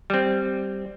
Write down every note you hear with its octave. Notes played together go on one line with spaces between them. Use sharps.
G3 C4